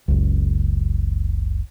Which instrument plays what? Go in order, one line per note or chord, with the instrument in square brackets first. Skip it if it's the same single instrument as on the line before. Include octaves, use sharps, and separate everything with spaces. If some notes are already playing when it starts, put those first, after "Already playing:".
[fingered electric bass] F#1 C#2